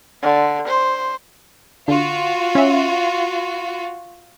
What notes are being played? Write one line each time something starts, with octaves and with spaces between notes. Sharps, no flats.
D3
C5
D3 F4 F#4
C#4 E5